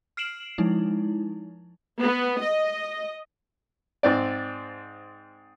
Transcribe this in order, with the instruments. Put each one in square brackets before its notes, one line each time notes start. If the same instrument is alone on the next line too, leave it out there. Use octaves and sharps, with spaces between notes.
[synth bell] F6 C7 D7 E7 F#7
F3 G#3 D#4 E4
[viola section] B3
D#5
[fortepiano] G#2 C4 D5